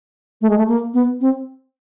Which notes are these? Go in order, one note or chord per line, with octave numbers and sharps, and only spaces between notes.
A3
G#3
A3
A#3
B3
C4